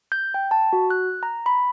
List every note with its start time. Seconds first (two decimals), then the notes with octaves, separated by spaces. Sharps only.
0.12 G6
0.34 G5
0.51 A5
0.73 F#4
0.90 F#6
1.23 A#5
1.46 B5